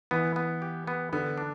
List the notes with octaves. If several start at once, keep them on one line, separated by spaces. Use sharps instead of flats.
E3 B3
B3
G4
B3
D3 B3
D4